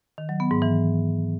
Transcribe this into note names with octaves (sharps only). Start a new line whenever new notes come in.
D#3
F#3
B3
G#2
E3